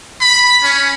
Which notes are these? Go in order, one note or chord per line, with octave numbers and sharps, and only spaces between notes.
B5
C#4